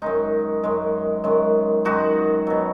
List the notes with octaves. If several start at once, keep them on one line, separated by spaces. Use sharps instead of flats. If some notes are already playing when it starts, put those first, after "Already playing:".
F#2 D#3 G#3 D#4
F#2 D#3 G#3
F#2 D#3 G#3
F#2 D#3 G#3 D#4 F#4
B2 F#3